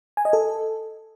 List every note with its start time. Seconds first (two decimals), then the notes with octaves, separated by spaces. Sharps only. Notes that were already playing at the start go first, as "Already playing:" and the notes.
0.17 G#5
0.25 D#5
0.33 A4